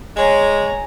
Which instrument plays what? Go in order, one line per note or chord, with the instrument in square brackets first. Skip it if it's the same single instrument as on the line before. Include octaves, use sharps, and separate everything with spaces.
[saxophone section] G#3 [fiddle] C#5 A#5 [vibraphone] G#5